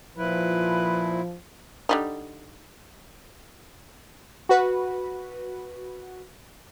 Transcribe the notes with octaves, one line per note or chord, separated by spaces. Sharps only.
A#2 F3 E4 B4
D3 G3 D#4
F#4 B4